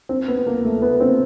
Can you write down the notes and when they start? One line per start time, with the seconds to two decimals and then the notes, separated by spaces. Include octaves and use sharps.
0.09 C4
0.28 B3
0.47 A#3
0.65 A3
0.82 B3
1.00 C4